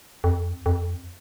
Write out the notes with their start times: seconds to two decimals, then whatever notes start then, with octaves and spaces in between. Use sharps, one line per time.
0.24 F2
0.66 F2